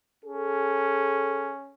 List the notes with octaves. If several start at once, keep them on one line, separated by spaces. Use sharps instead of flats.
C#4 G#4 A4